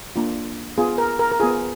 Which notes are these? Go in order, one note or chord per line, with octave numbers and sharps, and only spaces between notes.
A#3 D4 F4
B3 F4 G#4
A#4
A#4
A#4
B3 F4 G#4